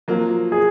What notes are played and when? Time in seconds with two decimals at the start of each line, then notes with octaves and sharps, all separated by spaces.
0.08 F3 F#3 A#3
0.52 G#4